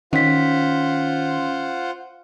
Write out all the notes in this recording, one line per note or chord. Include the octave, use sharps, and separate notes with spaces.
D#3 C#4 F4 C5 F#5 B6